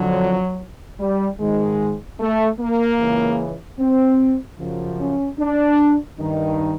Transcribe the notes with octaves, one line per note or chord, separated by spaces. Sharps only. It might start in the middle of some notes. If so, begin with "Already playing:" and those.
Already playing: F2 D3 F3 F#3
G3
G#2 D#3 G#3
A3
A#3
C#2 C#3 E3
C4
F#2 C#3 F3
C#4
D4
G2 D#3 D#4